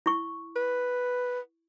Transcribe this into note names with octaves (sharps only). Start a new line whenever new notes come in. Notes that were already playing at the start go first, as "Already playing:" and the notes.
E4 C#6
B4